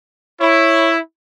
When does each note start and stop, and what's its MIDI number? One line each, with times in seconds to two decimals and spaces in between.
0.41 0.99 64
0.41 0.92 73